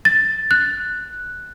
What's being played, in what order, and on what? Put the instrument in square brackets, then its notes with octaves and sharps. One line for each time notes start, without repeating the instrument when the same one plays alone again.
[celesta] A6
F#6